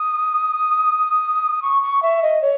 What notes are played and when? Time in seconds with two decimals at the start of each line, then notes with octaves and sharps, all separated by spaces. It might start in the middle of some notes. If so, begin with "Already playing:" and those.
Already playing: D#6
1.62 C#6
1.82 C#6
2.03 E5
2.23 D#5
2.42 C#5